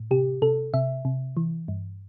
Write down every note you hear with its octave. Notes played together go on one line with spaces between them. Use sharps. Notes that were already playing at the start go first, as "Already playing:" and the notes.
Already playing: A2
C3 G4
C3 A4
C3 E5
C3
E3
G2